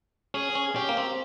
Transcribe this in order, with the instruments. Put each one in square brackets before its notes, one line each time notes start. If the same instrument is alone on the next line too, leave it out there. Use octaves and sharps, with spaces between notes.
[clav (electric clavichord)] C#4 [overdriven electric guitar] G#4
[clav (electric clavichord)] C#4
[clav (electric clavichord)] C#4 [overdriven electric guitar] G4
[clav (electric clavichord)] A#3
C4